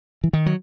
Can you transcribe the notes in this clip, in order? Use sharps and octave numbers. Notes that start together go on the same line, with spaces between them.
E3
D#3
F#3